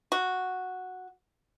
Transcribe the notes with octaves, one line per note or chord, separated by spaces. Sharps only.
F#4